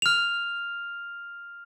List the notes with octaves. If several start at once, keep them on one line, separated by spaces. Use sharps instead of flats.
F6 F7